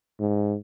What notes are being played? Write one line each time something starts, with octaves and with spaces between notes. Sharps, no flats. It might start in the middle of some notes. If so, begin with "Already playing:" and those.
G#2